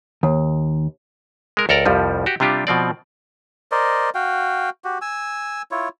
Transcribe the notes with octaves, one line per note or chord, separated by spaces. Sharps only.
D#2
G#3 A#4
C#2 A4 A#4 D5 A#5
C2 F2 F3 G3
F#4 G4
C3 G3 D4 F4 G4
B2 F3 C4 D5
A#4 C5 D5 D#5
F#4 F5 G5
F#4 G4
G#5 E6
E4 F4 C#5